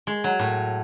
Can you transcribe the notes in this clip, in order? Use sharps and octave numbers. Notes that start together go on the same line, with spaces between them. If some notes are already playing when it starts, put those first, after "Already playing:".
G#3
F#3
A2